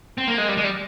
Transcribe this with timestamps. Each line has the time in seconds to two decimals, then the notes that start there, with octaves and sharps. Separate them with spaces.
0.18 C4
0.28 A#3
0.38 G#3
0.49 G3
0.57 G#3
0.64 G3